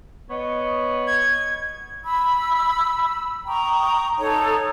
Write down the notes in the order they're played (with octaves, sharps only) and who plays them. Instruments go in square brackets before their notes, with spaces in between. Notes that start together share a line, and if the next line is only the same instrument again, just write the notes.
[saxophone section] B3 C#5 D#5
[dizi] G#6
[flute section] B5 E6
G5 A#5 C#6 D#6
D#4 A4 C#5